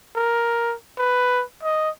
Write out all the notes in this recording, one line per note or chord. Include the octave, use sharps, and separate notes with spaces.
A#4
B4
D#5